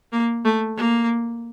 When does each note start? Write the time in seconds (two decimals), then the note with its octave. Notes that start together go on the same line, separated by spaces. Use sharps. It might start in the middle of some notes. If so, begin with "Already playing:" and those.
0.12 A#3
0.45 A3
0.77 A#3